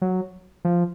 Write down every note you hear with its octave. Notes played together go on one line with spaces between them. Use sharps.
F#3
F3